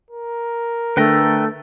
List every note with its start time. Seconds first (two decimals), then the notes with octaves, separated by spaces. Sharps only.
0.11 A#4
0.97 D3 A3 B4 G5 A#5